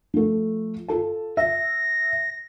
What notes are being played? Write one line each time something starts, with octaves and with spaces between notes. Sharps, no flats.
F3 A3
F4 A4 A5
E5 A#6